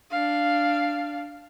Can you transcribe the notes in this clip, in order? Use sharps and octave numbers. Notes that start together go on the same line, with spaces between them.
D4 F5